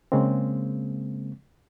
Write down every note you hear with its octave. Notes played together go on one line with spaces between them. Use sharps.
C#3 G#3 A#3 C4